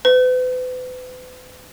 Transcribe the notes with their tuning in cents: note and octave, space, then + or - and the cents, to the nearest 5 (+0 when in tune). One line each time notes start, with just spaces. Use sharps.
B4 +40